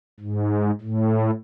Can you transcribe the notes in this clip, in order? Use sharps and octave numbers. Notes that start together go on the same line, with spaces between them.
G#2
A2